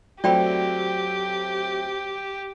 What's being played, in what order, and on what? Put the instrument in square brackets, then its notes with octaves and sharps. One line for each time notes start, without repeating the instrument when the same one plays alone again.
[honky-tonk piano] F#3 A3 C4 [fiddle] G4 [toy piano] D5 G5 B5